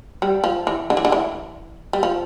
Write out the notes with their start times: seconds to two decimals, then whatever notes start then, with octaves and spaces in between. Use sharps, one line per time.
0.22 G3
0.44 F3
0.67 E3
0.90 D3
0.97 E3
1.05 D3
1.12 E3
1.93 G3
2.03 F3